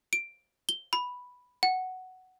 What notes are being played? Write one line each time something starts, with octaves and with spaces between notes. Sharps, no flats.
D7
G7
B5
F#5